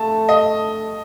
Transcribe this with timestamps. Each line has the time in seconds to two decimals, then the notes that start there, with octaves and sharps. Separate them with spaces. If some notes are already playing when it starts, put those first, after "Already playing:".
Already playing: A3 A5
0.29 D#5